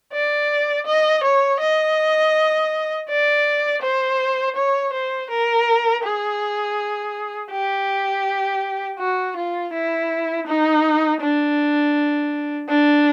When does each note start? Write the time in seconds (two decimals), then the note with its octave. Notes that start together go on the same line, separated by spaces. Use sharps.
0.13 D5
0.86 D#5
1.23 C#5
1.60 D#5
3.09 D5
3.82 C5
4.56 C#5
4.93 C5
5.30 A#4
6.04 G#4
7.51 G4
8.99 F#4
9.36 F4
9.73 E4
10.47 D#4
11.21 D4
12.69 D4